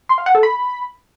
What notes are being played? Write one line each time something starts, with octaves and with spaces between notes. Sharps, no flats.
C6
F5
F#5
A4
B5